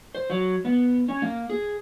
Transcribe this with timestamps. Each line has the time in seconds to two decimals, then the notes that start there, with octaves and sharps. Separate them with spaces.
0.15 C5
0.30 F#3
0.65 B3
1.08 C#4
1.22 A#3
1.50 G#4